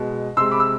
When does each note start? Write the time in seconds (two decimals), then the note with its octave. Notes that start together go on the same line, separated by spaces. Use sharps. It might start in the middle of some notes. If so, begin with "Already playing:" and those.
Already playing: B2 G#3
0.37 C3 G#3 C6 E6
0.51 B5 D6
0.60 E6